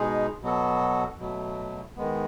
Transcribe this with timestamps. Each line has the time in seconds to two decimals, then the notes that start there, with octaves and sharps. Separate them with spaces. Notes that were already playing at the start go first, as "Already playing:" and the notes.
Already playing: B2 G#3 D#4 G#4
0.42 B2 F#3 B3 F#4 A4
1.19 B2 F#3 A3
1.96 D#3 G#3 B3